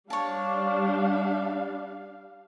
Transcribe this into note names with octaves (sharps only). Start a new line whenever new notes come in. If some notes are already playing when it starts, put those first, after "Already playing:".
G3 D4 C#5 F5 A5